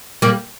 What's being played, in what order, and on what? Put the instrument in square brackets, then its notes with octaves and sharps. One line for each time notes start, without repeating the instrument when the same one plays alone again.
[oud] G3 A#3